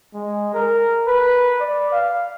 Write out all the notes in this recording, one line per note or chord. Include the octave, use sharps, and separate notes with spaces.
G#3
A#4
B4
D5
F5